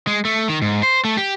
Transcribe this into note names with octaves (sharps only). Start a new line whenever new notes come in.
G#3
A3
D#3
G#2
C5
A3
G4